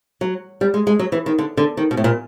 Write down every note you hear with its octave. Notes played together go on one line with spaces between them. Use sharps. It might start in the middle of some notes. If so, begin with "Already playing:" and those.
F#3
G3
G#3
G#3
F#3
E3
D#3
D3
D3
D#3
B2
A2
A#2